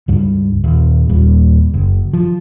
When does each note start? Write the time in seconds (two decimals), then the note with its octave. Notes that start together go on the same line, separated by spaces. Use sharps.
0.08 C#2 G2
0.64 D#1
1.09 D#2 A#2 G3
1.74 F#1
2.13 F3